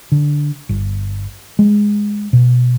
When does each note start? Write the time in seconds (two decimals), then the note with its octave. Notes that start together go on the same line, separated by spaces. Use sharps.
0.12 D3
0.69 G1
1.59 G#3
2.33 B2